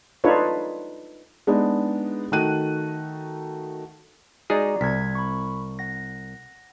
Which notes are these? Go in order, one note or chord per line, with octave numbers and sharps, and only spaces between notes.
D4 D#4 F4 A4 B4 C#5
G#3 B3 D4 D#4
D#3 A3 D#4 F#4 F#6 D#7
G#3 D#4 F#4 G#4 D5 A#5
C2 G#6 B6
B5 C#6
F#5 A#6